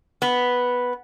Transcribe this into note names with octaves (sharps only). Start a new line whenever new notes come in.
B3